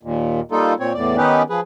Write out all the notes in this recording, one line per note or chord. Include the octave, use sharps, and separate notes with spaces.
D#2 A#2
G3 A#3 D#4 F4 A4
A#2 C4 C#5
E2 A2 D5
D#3 B3 C#4 D#4 G4 B4
F3 G#4 B4